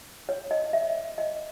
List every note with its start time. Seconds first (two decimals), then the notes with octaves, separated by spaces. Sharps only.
0.29 C#5
0.51 D#5
0.73 E5
1.18 D#5